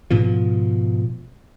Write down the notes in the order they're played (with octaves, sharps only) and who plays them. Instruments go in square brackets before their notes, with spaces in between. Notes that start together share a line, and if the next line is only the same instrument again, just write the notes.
[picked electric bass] G#2 B2 F3